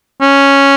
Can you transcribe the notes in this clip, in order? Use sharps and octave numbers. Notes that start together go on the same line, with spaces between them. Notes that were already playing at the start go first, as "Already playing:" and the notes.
C#4